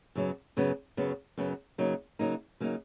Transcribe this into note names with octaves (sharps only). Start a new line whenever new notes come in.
F#2 C#3 F#3 B3
F#2 C#3 F#3 B3
F#2 C#3 F#3 B3
F#2 C#3 F#3 B3
C#3 F#3 A#3 D#4
C#3 F#3 A#3 D#4
C#3 F#3 A#3 D#4